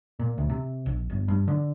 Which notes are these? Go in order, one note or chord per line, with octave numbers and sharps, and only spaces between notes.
A#2
D2
C3
A#1
G1
G2
D3